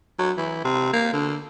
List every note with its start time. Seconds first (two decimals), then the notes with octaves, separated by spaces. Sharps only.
0.19 F#3
0.37 E3
0.64 C3
0.93 A#3
1.13 D3